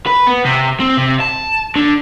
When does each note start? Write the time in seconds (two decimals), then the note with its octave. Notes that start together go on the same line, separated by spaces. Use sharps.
0.06 B4
0.27 B3
0.45 C3
0.80 C4
0.97 C3
1.20 A5
1.76 D3